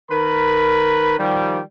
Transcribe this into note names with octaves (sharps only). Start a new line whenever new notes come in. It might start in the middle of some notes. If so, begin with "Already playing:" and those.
D#3 A#4 B4 B5
D#3 F3 G3